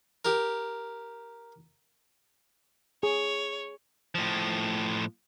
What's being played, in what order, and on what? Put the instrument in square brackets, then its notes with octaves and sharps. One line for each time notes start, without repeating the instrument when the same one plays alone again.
[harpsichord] G4 A#4
[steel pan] G#4 [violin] C#5
[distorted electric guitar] A2 F3